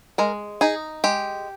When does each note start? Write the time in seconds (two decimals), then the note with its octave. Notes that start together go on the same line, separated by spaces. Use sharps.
0.18 G#3 A#4
0.61 D#4 G#4
1.04 G#3 G4